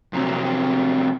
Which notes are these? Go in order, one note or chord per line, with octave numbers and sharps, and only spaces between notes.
F2 C3 F#3 C4